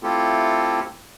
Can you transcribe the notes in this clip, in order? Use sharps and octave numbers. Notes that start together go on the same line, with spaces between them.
A3 C4 E4 F4 G4 A4